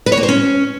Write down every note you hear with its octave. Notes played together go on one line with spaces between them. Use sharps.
B4
C#5
A#3
C5
C#4